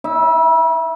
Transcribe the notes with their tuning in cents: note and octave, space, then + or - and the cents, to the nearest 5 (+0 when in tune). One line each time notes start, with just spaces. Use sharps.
E4 -45 E5 +0